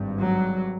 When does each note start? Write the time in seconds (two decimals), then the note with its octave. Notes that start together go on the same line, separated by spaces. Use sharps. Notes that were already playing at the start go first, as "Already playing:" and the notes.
Already playing: G#1 G2
0.20 F#3